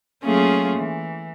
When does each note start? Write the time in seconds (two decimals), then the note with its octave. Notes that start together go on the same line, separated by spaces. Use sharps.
0.23 F#3 A3 A#3 C#4 F4 G#4
0.78 E3